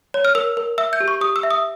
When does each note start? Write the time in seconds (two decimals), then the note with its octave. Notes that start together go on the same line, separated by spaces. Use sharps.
0.14 C#5
0.25 F6
0.35 A#4 E6
0.57 A#4
0.78 E5 E6
0.93 G6
1.00 G4
1.08 C#6
1.21 G4 D#6
1.36 E6
1.43 E5
1.51 D#6